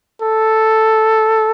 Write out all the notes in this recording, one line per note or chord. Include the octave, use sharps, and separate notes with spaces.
A4